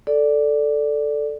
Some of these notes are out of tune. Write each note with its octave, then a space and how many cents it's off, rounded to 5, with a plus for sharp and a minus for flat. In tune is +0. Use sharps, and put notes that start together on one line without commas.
A4 +0 D5 +0